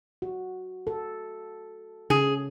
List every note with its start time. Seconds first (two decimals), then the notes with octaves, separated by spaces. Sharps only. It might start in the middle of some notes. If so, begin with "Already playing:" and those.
0.22 F#4
0.87 A4
2.10 C#3 G#4